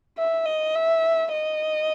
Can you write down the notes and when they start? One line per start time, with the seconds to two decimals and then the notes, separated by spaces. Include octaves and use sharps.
0.18 E5
0.46 D#5
0.75 E5
1.32 D#5